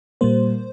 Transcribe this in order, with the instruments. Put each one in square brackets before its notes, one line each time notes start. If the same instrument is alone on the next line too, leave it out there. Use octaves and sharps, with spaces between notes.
[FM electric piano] A#2 G3 A#3 C5